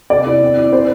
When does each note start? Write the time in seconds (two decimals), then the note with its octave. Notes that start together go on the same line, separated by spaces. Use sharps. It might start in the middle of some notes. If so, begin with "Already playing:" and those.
0.10 C3 D5
0.26 E4
0.41 C4
0.57 E4
0.72 E4 C5